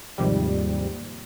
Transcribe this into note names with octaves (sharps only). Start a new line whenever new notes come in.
D#2 G#2 C3 F3 G3